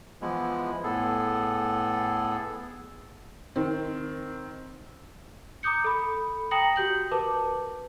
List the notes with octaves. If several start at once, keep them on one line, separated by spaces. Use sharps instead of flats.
E3 F3 G#3 B3 E4
A2 B3 G#4 A4
D#3 C4
A#5 D6 D#6 G6 C#7
A4 B5
G5 A#5 D#6 A#6 C#7 F#7
F#4 G4 G6 F#7
A#4 B4 A5 D6